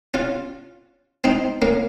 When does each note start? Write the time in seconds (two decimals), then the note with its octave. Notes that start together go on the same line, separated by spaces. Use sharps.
0.14 C#4 F4
1.24 C4 D#4
1.62 A#3 C#4